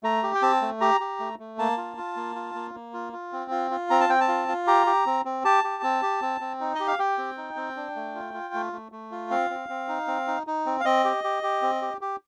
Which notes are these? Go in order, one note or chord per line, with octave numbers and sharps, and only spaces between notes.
A3 A#5
G4
G5
C4 A5
A3
G4 A#5
G4
A3
A3
A#3 A5
F4
F4
A#3
F4
A#3
A#3
F4
F4
C4
F4
F4
C4 A#5
A5
C4 G5
A5
F4
F4
G4 A#5
G4
C4
C4
G4 A5
G4
C4
G4
C4
C4
D#4
G4 D#5
F5
G4 G5
C4
D#4
C4
D4
A3
F4
F4
A3
A3
A3
F4
C4 F5
C4
C4
D#4
C4
D#4
D#4
C4
F5
C4 D#5
G4
G4
G4
C4
G4
G4